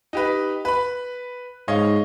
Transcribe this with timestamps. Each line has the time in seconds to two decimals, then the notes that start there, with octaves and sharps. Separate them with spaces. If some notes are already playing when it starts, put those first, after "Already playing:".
0.13 D#4 G4 B4
0.65 B4 B5
1.68 G#2 C#5 D#5 F5